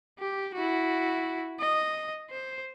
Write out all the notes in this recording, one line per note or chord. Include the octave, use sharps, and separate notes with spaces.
G4
E4 F#4
D#5
C5